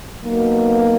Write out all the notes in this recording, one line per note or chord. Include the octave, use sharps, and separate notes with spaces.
B1 B2 A#3